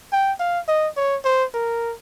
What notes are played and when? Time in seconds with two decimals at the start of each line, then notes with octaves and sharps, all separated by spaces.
0.12 G5
0.40 F5
0.68 D#5
0.96 C#5
1.25 C5
1.54 A#4